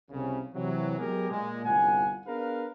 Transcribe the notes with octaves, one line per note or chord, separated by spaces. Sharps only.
C2 C#3
C3 E3 F#3
F#3 G#3 B3 G4 G#4 A#4
A#2 G#3
G1 C2 F4 F#5 G#5
B3 D4 G#4 A#4 B4 F5